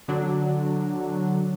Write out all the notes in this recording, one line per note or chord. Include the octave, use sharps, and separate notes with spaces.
D3 F#3 D4 F#4